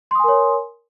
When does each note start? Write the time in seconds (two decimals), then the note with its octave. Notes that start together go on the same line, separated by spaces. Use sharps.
0.11 C6
0.15 D#6
0.20 G#5
0.24 A#4
0.28 C#5